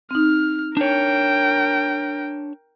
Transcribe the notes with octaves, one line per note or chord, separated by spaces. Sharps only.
C4 D#4 F6
D4 A#4 C#5 G5